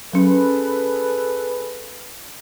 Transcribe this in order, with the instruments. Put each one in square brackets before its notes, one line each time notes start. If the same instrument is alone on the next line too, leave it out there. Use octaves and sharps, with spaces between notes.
[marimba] F#3 C#4 [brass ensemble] G#4 A4 B4